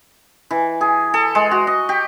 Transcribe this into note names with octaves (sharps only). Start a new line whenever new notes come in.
E3
G#4
A4
G#3
F#4
D#5
G4